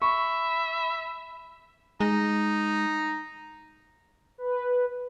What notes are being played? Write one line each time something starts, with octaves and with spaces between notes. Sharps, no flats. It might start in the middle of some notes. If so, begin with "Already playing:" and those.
E5 B5 C#6
G#3 D#4
B4